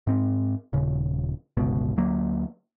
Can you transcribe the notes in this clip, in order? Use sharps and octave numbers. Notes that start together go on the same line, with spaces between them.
G#2 C4
D#1 C#3
G1 C#2 B2
D2 F#3 A#3